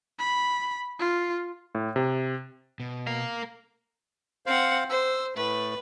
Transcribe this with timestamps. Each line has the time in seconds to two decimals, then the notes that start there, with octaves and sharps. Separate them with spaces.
0.19 B5
0.99 F4
1.75 A2
1.96 C3
2.80 B2
3.07 A#4 F5
4.46 C4 C5 F5 F#5
4.90 C5 E6
5.36 A2 A3 B4